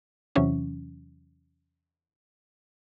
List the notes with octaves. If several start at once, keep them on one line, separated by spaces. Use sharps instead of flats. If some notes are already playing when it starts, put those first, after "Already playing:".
E2 C3 E3 F#3 C#4